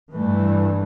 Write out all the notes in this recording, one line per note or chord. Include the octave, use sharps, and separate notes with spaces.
G2 E3 A3